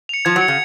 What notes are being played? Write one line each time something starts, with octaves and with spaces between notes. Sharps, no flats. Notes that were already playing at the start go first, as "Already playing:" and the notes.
C#7 F7
F3 G#6
F#3
C#7 F7
C#3